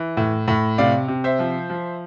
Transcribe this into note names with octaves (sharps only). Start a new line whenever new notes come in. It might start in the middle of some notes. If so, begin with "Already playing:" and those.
Already playing: E3
A2
A2
C3 D5 F5
C3
C5 E5
F3
F3